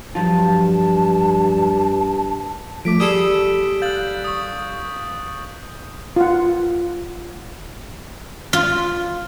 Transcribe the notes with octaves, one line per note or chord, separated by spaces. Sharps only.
G2 F3 F#3 F4 A5
F3 A3 D6 B6 D7
G3 G#4 A4 D#6
F5 F#6 G6 A6 F#7
C#6 D#6
F4 F#5
F4